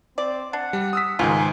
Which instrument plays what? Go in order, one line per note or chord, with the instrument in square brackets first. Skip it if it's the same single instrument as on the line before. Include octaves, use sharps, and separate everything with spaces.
[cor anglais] C4 [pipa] D5
[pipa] D4 [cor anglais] F#5
[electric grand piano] G3
D#6 E6 B6
[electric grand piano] C#2 G#2 D#3 [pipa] F4 [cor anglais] G#5